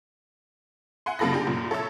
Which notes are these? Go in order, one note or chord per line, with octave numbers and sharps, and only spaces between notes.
E5 F#5 G#5 C6
F#2 C#3 A#3 A4 B5 A#6
D4 G4 G#4
F#2 A#2
A4 C#5 E5 E6